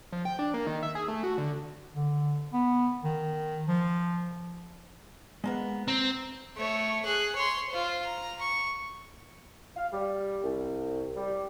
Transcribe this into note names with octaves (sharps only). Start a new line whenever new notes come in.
F3
G5
D4
A#3
D#3
E5
G#4
A3
F#4
D3
D3
B3
D#3
F3
G#3 A#3 B3
C4 A#5
A3 C#5
G#4 F#6
C#5 C6
F4 C5
A#5
C#6
F5
G3
C2
G3